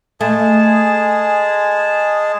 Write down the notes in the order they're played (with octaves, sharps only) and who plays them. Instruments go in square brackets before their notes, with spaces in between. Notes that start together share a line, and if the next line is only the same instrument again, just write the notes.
[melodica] G#3 G#4 A5 [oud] A3